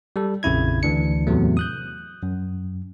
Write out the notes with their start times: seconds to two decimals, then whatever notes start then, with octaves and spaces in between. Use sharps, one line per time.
0.16 G3 A4
0.43 A#1 F2 C#3 E4 G#6
0.83 D2 E3 D4 C#7
1.27 E2 A2 C3 F#3 A3
1.57 D#6 F#6 G6
2.23 F#2